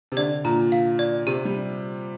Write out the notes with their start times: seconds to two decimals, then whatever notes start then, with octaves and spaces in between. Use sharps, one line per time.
0.12 C3
0.17 D3 D5
0.44 A#2 A#5
0.72 F5
0.99 D5
1.27 C3 G4
1.45 G3